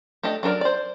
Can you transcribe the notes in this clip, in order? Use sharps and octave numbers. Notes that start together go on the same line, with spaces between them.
A3 D4 G4 D#5
F#3 D4 A4 A#4 D5
C5 D5